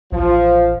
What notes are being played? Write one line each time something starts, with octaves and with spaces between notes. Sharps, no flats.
A1 F3